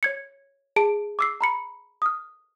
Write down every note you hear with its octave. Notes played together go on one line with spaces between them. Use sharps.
C#5 G#6 C#7
G#4 A5 D7
D6 E6 C7
A#5 B5 C#7
D#6 F6